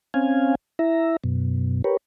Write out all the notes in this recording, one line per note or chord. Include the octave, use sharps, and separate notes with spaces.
C4 C#4 F5 G#5
E4 E5 A#5
F#2 B2
G4 A#4 B4 C#5